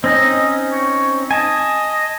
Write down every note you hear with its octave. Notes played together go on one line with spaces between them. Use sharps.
C4 C#4 D#4 D#5
C#5
D#5 G#5 A5